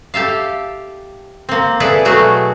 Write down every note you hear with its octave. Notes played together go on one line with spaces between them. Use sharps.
G4 A4 E5 F5
A#3 C4
E4 G#4 A4 B4 D5 F#5
B2 F#3 A3 F#4 G#4